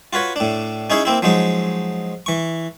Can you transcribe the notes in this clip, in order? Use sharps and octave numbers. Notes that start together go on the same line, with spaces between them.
F4 F#4 B4 C#5
A2 D4
C#4 D#4 E4 G#4 C#5
A#3 C4 E4
F3 F#3 G#3 D#4
E3 C#6